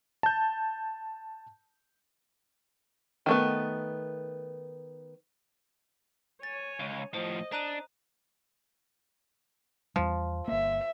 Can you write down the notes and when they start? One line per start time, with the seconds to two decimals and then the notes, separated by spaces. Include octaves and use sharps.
0.23 A5 G6
3.26 D#3 A3 B3
6.43 C#5 G#5 A6
6.80 C#2
7.14 A2 F3 C5 D#5
7.52 D4 A#5 F#6 D#7
9.96 E2 F3 G3
10.48 G1 A#3 E5